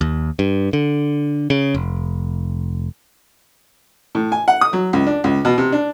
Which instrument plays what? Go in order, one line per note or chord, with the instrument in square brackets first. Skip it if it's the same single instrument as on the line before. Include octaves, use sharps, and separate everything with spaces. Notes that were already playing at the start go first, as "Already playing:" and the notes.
[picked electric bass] D#2
G2
D3
C#3
F1
[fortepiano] A2
G#5
F#5
D#6
F#3
C#2
D4
C#2
B2
C3
D4